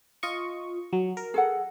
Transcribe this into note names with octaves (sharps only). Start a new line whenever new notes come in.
F4 D#5 C#6
F#3
A#4
G#4 A4 F#5